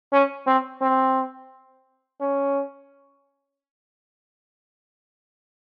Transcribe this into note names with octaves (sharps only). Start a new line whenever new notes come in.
C#4
C4
C4
C#4